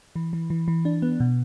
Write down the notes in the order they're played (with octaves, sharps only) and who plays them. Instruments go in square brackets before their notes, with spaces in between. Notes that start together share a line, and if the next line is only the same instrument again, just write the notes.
[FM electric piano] E3
E3
E3
E3
D4
B3
B2